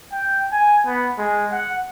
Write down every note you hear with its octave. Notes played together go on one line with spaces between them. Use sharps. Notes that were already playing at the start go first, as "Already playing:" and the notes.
G5
G#5
B3
G#3
F#5